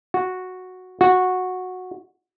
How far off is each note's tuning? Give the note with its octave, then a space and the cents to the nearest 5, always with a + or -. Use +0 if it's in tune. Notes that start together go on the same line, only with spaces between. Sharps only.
F#4 -5
F#4 -10